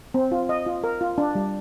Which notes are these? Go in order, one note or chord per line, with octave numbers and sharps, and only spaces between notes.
C4
F4
D#5
F4
A#4
F4
D4
G3